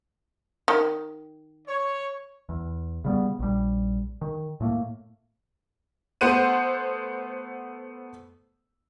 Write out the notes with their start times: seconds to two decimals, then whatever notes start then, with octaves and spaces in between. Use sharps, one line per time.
0.68 D#3
1.68 C#5
2.49 E2
3.04 C#3 G3 B3
3.39 A#1 G3
4.21 D#3
4.60 A2 A3 A#3
6.21 A3 B3 C5 F#5 D#7